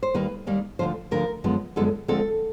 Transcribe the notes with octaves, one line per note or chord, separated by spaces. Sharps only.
C5
D#2 D#3 G3 A#3 B4
D#2 D#3 G3 A#3
D2 D3 F3 C5
D2 D3 F3 A#4
F#2 D3 F3 G#3 B3
F#2 D3 F3 G#3 B3 A4
D2 D3 F3 G#3 C4 A4